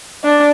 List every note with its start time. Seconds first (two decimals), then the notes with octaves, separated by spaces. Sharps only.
0.24 D4